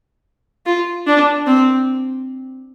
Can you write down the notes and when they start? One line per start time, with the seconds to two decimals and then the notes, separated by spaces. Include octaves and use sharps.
0.66 F4
1.07 D4
1.47 C4